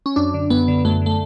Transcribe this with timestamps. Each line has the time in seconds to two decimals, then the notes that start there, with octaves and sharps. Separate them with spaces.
0.06 C#4
0.16 F#2 D4
0.34 D3
0.50 F#2 B3
0.68 D3
0.85 F#2 A3
1.02 D3 A3